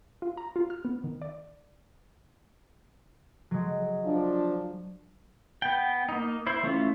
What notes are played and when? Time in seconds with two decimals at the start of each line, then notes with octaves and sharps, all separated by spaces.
0.22 F4
0.37 A#5
0.56 F4
0.70 F6
0.85 B3
1.04 D#3
1.22 D5
3.51 F#3 G#3
4.04 F3 D4
5.62 B3 G5
6.09 A#3 D#4
6.47 E4 C5
6.63 E3 A3 C#4 E4 F4